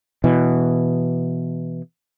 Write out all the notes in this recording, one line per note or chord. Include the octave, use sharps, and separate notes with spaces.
B2 E3